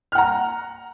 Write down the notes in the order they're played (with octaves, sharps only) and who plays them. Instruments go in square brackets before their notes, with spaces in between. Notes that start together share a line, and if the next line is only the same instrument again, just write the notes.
[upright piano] F6
F#5
A#5